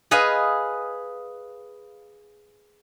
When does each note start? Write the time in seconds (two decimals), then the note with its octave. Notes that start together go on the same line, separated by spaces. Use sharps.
0.11 G#4 B4 D#5 F5